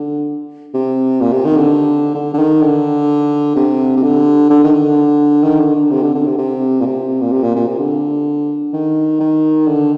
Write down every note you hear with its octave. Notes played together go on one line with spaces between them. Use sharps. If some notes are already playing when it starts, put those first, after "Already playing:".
Already playing: D3
C3
A#2
C3
D#3
D3
D3
D3
D#3
D3
C3
C3
D3
D3
D#3
D3
D#3
D3
D3
C3
D3
D3
C3
C3
A#2
C3
A#2
C3
A#2
A#2
C3
D3
D#3
D#3
D3